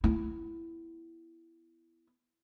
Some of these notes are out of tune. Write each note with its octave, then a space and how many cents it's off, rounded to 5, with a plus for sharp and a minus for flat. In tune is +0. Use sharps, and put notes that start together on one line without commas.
B3 +0 E4 +10